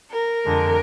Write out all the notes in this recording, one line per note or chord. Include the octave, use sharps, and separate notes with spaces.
A#4
F2 D3 G#3